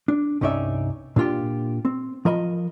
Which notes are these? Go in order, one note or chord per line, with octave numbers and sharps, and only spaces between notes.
D4
C2 G2 C#4 D#4 D5 E5
A#2 D4 F4 G4
C4
F3 A#4 D#5 B5